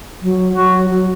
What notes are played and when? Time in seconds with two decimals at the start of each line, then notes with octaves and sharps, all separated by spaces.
0.23 F#3
0.56 F#3 F#4
0.90 F#3